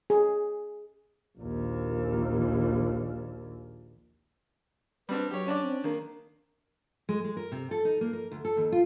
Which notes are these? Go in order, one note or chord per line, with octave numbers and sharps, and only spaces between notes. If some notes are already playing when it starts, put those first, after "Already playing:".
G#4
A#1 D#2
G3 C4 D4 B4
F#3 G4 C#5
C#4 D4 D5
C4
D#3 A#3 D4
G#3
G#3
A#4
C3
A4
D#4
A#3
A#4
D2
A4
D#2
F4